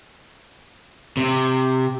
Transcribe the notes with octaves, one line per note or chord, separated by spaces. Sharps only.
C3